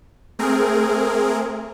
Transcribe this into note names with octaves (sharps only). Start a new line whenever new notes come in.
A3 C4 G#4 A#4